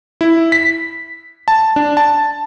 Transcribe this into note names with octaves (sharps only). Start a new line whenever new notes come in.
E4
B6
A5
D4
A5